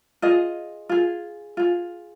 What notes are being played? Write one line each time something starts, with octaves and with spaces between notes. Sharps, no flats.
F4 G#4 D#5
F4 G#4
F4 G#4